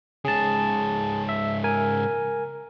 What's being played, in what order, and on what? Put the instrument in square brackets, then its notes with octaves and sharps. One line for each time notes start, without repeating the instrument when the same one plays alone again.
[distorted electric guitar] G#2 C#3 [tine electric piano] G#4 A5
[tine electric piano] E5
A#4 G#5